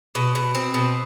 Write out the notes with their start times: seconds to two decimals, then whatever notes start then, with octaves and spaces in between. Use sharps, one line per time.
0.15 B2
0.35 B2
0.55 C4
0.74 B2